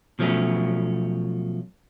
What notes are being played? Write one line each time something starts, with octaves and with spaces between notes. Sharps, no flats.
B2 F3 F#3 A3 C#4